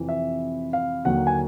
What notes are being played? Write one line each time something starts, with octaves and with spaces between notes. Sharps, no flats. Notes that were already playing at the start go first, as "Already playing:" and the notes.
Already playing: F2 C3 E3
E5
F5
D#2 D3 F#3 A#3 F#5
G#5